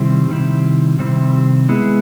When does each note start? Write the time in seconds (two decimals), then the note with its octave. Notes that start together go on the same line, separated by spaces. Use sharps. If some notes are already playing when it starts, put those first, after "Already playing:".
Already playing: C3 D#3 G3 C4 E4
0.29 C3 D#3 G3 C4 E4
0.99 C3 D#3 G3 C4 E4
1.68 G#3 B3 E4 G#4